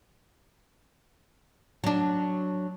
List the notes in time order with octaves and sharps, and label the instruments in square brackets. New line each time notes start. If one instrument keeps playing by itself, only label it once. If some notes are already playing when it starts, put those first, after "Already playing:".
[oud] F#3 D4